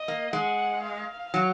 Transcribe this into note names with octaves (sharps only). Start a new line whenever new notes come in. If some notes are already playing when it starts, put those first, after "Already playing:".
Already playing: D#5
A#3
G#3 F#5
F5
F#3